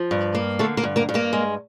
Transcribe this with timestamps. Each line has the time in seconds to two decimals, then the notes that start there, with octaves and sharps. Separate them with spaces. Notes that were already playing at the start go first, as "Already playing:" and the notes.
Already playing: F3
0.11 G2
0.35 A#3
0.59 D3 A3 A4
0.77 A#3 A#4
0.83 G2
0.96 A#3 A#4
1.09 G2
1.14 A#3 A#4
1.33 G#3